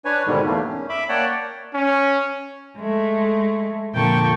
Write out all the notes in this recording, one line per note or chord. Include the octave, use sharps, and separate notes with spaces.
D4 B4 C#5 G#5
G#2 B2 D3 D#3 G3
E2 A3 A#3
C#4
E5 B5 D6
A#3 C#5 D5 F#5 G5 A5
C#4
G#3 A3
F2 A#2 D3 G5 A5 C#6